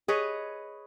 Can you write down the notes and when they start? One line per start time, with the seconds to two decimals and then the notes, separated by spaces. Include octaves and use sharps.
0.08 G#4 B4 C#5 D#5